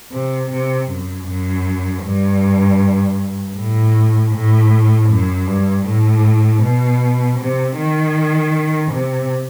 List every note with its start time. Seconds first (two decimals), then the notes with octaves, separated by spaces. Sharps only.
0.12 C3
0.50 C3
0.90 F#2
1.28 F#2
2.04 G2
3.56 A2
4.33 A2
5.09 F#2
5.47 G2
5.86 A2
6.62 B2
7.38 C3
7.77 D#3
8.91 C3